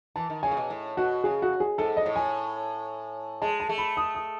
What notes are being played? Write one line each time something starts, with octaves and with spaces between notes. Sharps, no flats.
E3 A5
D#3
C#3 G#5
A2
B2
A2
B2 F#4
C#3 G#4
F#4
G#4
G#2 A4
D#5
A2
G#5
G#3 A5
A5
A3
B5
D#6
D#6